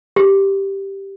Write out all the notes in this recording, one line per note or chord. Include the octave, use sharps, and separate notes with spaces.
G4